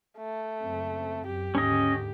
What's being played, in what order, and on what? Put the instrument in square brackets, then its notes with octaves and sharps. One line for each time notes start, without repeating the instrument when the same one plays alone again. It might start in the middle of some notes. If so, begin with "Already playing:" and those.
[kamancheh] A3
[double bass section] F#1 C4
[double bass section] F#2 [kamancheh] G4
[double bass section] D#2 G#2 D3 [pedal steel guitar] C#4 D#5